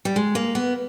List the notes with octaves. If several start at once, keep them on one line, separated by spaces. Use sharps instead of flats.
G3
G#3
A#3
B3